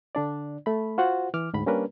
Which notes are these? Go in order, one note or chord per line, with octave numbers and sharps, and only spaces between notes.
D3 D4 D5
A3 B5
F4 F#4 C5 F#5
E3 D6 F6
D2 G#2 B5
G3 A#3 C#4 D4 A#4 B4